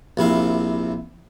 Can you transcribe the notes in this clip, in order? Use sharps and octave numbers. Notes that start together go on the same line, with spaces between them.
A#1 C3 E4 F5